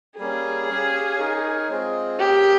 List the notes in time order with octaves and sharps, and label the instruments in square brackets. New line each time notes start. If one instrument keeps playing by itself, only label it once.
[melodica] G3 A#3 C#4 [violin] G#4
[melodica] C#4 G4 C#5 F5
D#4 A#4 C#5
G#3 C4 F4 G#4
[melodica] A#3 C#4 G#4 [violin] G4